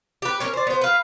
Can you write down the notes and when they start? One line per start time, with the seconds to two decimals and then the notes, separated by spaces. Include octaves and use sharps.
0.22 G4 B4
0.40 C#4 A#4 C#5
0.53 C5 D5
0.67 B3 C5
0.81 B4 F5